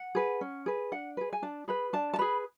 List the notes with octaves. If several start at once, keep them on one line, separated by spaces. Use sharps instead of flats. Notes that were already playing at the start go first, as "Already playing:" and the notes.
Already playing: F#5
G#4 B4
C#4
G#4 B4
D4 F#5
G#4 B4
G#5
D4 A5
G#4 B4 B5
D4 A5
A5
G#4 B4 B5